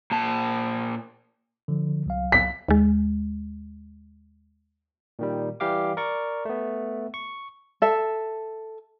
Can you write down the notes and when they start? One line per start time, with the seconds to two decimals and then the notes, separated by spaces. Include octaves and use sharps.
0.11 A#2 A5
1.68 D3 F3
2.06 C2 F#3 F5
2.32 B6
2.68 D#2 G#3
5.19 A#2 D#3 G3
5.60 E3 G3 G4 F5 D6
5.97 A#4 D5 C#6
6.45 A3 B3
7.14 C#6
7.82 A4 E5